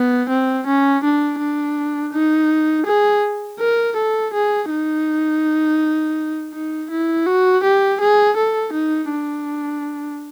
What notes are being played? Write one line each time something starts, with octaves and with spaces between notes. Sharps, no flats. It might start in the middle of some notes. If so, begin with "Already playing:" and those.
Already playing: B3
C4
C#4
D4
D4
D#4
G#4
A#4
A4
G#4
D#4
D#4
E4
F#4
G4
G#4
A4
D#4
D4